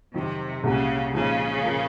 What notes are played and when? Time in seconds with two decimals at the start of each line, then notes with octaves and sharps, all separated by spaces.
0.14 F2 C3 D#3 F#3
0.64 C2 A#2 C#3 G#3 C#4 F#4
1.13 A#2 C#3 F3 G#3 D#4 G#4
1.63 A#2 F3 A#3